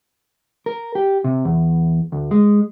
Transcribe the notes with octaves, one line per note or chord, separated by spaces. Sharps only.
A#4
G4
C3
E2
D2
G#3